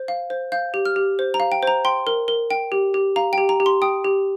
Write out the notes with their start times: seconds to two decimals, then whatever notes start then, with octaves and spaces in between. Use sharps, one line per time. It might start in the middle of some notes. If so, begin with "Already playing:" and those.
Already playing: C5
0.08 F5
0.30 C5
0.52 F5 G6
0.74 G4
0.85 F6
0.96 G4
1.19 C5
1.34 A#5
1.40 F5
1.52 G5
1.63 C5 A#5
1.85 G5 C6
2.07 A#4
2.28 A#4
2.51 G5
2.72 G4
2.94 G4
3.16 F5 A#5
3.33 G4 G5
3.49 A#5
3.60 G4
3.66 C6
3.82 G5 D#6
4.05 G4